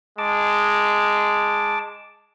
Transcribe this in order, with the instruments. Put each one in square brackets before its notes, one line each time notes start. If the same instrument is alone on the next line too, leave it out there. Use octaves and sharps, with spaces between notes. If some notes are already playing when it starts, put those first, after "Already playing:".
[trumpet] G#3 [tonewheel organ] A5 D6